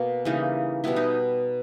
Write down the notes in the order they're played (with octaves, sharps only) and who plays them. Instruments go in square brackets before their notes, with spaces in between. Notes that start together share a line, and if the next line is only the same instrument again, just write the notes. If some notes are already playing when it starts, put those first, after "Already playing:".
Already playing: [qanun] B2 A#3
C#3 E3 G3 A#3 D#4
B2 G3 B3 E4
D#4